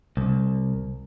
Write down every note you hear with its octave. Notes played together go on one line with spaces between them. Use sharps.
C2